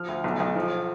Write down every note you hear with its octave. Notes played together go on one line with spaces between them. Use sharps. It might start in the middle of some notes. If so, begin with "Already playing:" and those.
Already playing: F3 F6
D2
B1
B1
F3